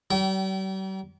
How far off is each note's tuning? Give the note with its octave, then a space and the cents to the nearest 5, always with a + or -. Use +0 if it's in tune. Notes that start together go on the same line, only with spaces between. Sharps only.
G3 -45 G5 -30